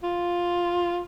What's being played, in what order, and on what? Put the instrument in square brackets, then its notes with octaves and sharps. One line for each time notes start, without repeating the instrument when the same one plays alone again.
[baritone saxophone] F4